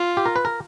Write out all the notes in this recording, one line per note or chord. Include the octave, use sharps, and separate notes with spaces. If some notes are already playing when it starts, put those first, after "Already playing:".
Already playing: F4
G4
A#4
B4
A#4